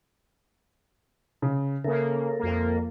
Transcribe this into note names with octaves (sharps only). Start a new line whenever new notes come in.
C#3
C#3 A#3 A4 A#4 E5
F2 A#3